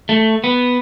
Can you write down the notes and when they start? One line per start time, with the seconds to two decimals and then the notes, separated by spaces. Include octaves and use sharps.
0.09 A3
0.44 B3